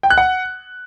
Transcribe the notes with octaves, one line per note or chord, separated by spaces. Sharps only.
G5
F#6
F#5